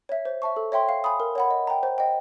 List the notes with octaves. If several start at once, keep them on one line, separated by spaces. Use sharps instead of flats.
C#5 E5
C5
E5 A5 C#6
A4
C#5 E5 G5 C6
F5
G#5 B5 D#6
A#4
C#5 F#5 B5
D#5
G5 A#5
C5
D#5 G5